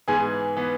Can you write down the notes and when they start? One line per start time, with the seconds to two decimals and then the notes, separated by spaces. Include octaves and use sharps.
0.08 G#2 E3 B3 G#4 G#5
0.57 E3 B3